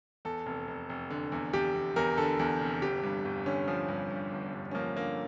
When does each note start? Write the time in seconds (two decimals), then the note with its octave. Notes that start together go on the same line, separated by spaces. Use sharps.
0.25 E2 A4
0.46 F1
0.68 F1
0.89 F1
1.10 D3
1.32 E2
1.53 E2 G4
1.74 E2
1.96 E2 A#4
2.18 D3 A4
2.39 E2
2.61 F1
2.82 G1 G4
3.03 G2
3.25 G1
3.46 D3 C#4
3.68 F3
3.89 G2
4.10 G2
4.32 G1
4.53 G2
4.71 C#4
4.75 F3 A#3
4.96 D3 A#3